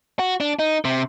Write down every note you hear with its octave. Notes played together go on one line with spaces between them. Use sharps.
F#4
D4
D#4
C3